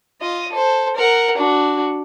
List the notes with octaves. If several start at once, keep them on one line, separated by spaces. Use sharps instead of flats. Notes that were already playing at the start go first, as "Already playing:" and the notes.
F4 D#5
A4 C5
A#4 F#5
D4 F#4